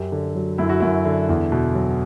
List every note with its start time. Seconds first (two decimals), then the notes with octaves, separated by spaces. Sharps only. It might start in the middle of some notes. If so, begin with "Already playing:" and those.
Already playing: F#2 G4
0.12 D3
0.35 F#3
0.58 F#2 E4
0.69 F#4
0.80 F#2 E4
1.05 D3
1.29 E2
1.52 B2
1.75 F#3